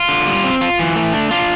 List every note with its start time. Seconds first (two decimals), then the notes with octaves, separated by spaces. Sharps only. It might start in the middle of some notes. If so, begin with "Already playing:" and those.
Already playing: F4
0.09 D3
0.26 G3
0.44 C4
0.61 F4
0.79 E3
0.96 A3
1.13 D4
1.31 D4 F4